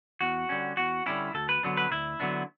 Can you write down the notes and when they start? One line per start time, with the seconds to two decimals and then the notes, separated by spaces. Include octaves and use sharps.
0.21 E2 F#4
0.49 D3 G3 C#4
0.77 E2 F#4
1.06 D3 G3 C#4 E4
1.35 D2 A4
1.49 B4
1.63 D3 F#3 B3 D4
1.77 B4
1.91 D2 E4
2.20 D3 F#3 B3 D4